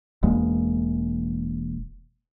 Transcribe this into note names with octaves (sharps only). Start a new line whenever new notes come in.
E1 E2 G#3 A#3